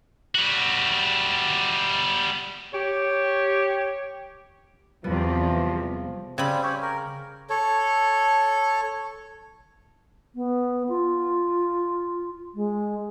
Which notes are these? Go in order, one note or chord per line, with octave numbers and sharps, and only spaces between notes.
G3 F#4
G4 C#5
E2 C3 F3 G3 B3
C#3 G3 C4 B5
G4 C#5
A#4
A4 C#5
B3
F4
G#3